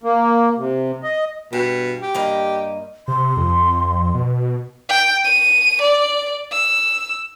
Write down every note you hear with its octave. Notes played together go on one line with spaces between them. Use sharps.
A#3
C3
D#5
G2 B2
G4
G2 A#3 D#5
C3 C6
F2
B2
G5
D#7
D5
E6